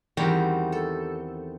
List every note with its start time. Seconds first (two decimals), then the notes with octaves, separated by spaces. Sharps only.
0.17 E2 D#3 G3 C4 F#4 G4
0.72 A4